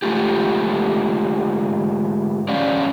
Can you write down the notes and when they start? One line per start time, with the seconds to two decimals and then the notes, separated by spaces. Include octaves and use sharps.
0.02 G#2 D3 A3 F4 G4
2.48 G2 C#4 D5 F5